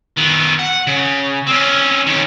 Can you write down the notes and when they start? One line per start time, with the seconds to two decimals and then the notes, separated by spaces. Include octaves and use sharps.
0.17 D#3 B3
0.59 F#5
0.87 C#3
1.46 C4 C#4
2.06 D#3 C#4